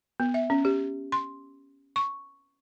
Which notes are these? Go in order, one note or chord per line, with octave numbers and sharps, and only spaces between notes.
B3
E5
C#4
G4
C6
C#6